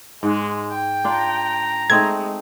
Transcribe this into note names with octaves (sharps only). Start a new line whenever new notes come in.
G#2 G#3 F#5
G5
D4 F4 A#5
G#3 A3 C4 D#4 G#6